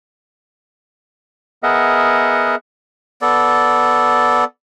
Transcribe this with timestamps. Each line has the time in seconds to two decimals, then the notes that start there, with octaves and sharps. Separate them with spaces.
1.63 B3 G#4 A#4 D#5 E5 F#5
3.22 B3 A4 D5